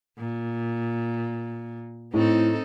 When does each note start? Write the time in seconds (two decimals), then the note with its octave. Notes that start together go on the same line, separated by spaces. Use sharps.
0.19 A#2
2.14 A2 C4 D#4 A4